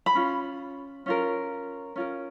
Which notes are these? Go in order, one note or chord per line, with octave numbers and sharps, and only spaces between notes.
B5
C#4 F4
C#4 F4 A#4
C#4 F4 A#4